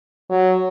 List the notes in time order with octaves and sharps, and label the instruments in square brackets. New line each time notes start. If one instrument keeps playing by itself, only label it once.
[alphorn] F#3